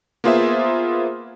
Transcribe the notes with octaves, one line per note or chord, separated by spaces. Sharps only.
A#3 B3 F4 G#4 C5 E5